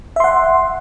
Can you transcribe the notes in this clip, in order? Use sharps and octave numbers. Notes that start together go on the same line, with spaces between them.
E5 F#5 C6